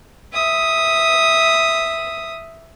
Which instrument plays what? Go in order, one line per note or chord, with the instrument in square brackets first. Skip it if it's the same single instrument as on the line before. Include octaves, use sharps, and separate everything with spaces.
[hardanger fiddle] E5 D#6